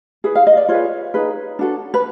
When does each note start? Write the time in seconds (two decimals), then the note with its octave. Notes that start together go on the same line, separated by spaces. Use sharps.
0.24 E4 G#4 B4
0.35 F5
0.47 D#5
0.57 D5
0.69 F4 G#4 B4 C#5
1.14 D#4 G#4 B4
1.59 D4 F#4 A4
1.94 B4